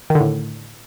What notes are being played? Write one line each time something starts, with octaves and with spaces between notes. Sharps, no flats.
D#3
D3
A2